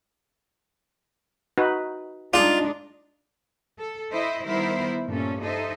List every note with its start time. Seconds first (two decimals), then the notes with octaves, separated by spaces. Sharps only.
1.58 D#4 F#4 B4
2.34 G#3 D4 D#4 F4 G#4 D5
3.79 A4
4.11 E4 C5 D#5 E5
4.44 D#3 G3 B3 E4 A#4 C5
5.08 G2 A#2 C#4 A4
5.43 D#4 A4 C5 D#5 E5